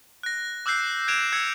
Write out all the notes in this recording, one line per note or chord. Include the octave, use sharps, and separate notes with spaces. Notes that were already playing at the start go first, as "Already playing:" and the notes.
F#6 A#6
D6 E6 F#6 G6 C7
F#6 G#6 D7 E7 F7
E6 G#6 C#7